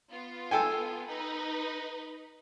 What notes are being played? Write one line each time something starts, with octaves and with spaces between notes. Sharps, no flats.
B3 F4
A4 G5 G#5
D#4 B4